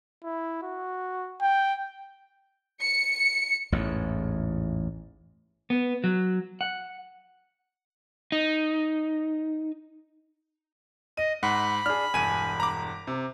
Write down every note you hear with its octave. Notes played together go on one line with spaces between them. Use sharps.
E4
F#4
G5
C#7
A1 E2 G#2
B3
F#3
F#5
D#4
D#5 D#7
G#2 F#5 B5
D4 G#4 F6
E1 G2 G#5 D#7
A#5 D6
C3